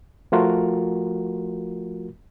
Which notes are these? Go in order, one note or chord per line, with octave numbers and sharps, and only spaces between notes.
F3 A3 F4 F#4 A#4